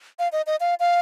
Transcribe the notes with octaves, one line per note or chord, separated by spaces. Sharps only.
F5
D#5
D#5
F5
F5